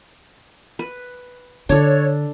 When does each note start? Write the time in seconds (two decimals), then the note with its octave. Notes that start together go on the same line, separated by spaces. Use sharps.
0.79 B4
1.69 D3 D4 A4 C#5